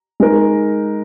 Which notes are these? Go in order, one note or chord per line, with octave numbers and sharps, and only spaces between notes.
G#3 D#4 A#4